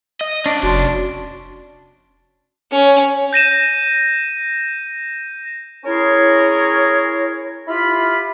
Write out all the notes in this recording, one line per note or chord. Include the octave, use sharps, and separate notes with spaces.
D#5
C#4 D4 D5
F1 F#4 A5 C6
C#4 C#5
G6 A#6 D#7 E7
C#4 E4 G#4 A#4 C#5
E4 F4 G4 F5 B5